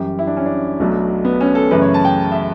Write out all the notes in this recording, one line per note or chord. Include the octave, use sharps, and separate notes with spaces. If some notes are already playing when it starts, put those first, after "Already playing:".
Already playing: F#2 E3 G3 G4
E4
D4
C#4
D4
B1 B2 F#3 A3
B3
C#4
A4
F#2 C#3 E3 A3 B4
C#5
A5
G5
E5